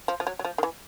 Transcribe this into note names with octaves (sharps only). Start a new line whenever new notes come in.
F3
F3
F#3
F#3
F3
D#3
E3